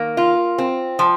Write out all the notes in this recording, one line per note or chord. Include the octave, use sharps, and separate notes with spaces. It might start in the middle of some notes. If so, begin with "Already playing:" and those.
Already playing: D#3 A#3
F4
C4
F3